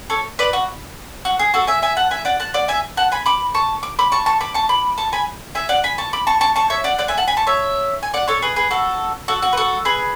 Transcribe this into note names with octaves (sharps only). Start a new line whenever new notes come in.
A4 C#5
B4 D5
F#4
F#4
G#4
F#4 A4
E5 G#5
E5 G#5
F#5 A5
E5 G#5
D5 F#5
F#5 A5
D5 F#5
E5 G#5
F#5 A5
G#5 B5
B5 D6
A5 C#6
D6
B5 D6
A5 C#6
A5 C#6
B5 D6
A5 C#6
B5 D6
A5 C#6
G#5 B5
E5 G#5
D5 F#5
G#5 B5
A5 C#6
B5 D6
A5 C#6
A5 C#6
A5 C#6
C#5 E5
D5 F#5
D5 F#5
E5 G#5
F#5 A5
G#5 B5
A5 C#6
C#5 E5
G#5
D5 F#5
A4 C#5
G#4 B4
G#4 B4
F#4 A4
F#4 A4
F#4
B4
F#4 A4
G#4 B4